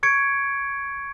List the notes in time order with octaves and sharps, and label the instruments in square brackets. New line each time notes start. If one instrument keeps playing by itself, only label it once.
[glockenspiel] C#6 G#6 C#7 D7